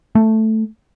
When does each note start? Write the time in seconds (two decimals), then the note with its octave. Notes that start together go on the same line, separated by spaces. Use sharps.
0.15 A3